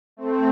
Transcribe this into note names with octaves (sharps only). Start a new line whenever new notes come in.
A3 C4